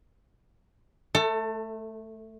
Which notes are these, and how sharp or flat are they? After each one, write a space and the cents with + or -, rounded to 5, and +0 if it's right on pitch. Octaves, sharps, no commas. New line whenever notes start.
A3 -10 A4 +25